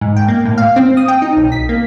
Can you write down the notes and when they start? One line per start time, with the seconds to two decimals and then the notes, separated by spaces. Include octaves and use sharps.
0.01 G#2
0.16 G5
0.28 A#3
0.45 A2
0.58 F5
0.76 C4
0.97 D#6
1.08 G5
1.22 D#4
1.37 B1
1.52 B6
1.69 A#3